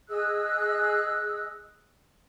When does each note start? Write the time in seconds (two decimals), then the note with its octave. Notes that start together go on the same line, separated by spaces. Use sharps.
0.08 G#4 D#5 E6 F#6